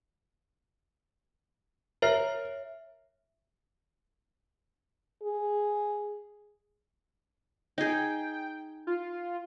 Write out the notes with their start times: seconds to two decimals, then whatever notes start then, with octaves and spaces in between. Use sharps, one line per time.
2.02 A#4 C#5 E5 C7
5.23 G#4
7.78 D#4 G#4 G5
8.87 F4